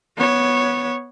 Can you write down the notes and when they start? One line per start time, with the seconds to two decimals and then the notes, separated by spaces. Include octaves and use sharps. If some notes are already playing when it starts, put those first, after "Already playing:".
0.17 B3 C#5